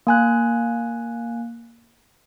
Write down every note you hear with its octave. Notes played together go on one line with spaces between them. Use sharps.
A#3 G#5 F#6